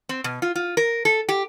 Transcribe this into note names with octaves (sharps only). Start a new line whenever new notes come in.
C4
B2
F4
F4
A#4
A4
G4